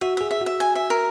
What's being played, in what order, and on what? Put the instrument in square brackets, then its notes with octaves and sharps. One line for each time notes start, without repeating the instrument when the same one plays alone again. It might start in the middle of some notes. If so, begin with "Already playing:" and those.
[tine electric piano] F#4 [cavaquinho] E5
[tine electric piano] G#4 [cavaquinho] E5
[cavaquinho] E5
[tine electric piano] F#4 [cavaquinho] E5
[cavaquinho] G#5
E5
A#4